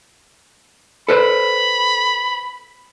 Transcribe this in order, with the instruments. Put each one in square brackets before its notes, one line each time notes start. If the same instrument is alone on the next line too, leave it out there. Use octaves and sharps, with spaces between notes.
[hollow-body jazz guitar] A4 B4 C5 [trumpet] B5